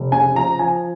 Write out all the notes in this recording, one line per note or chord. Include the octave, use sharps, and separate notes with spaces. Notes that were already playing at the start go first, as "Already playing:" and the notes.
Already playing: F1
C#3 G#5
F3 A#5
F3 G#5